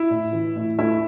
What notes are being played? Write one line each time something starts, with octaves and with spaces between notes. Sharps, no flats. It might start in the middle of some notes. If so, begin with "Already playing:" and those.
Already playing: E4 E5
A2
E3
A2
A3 E4 E5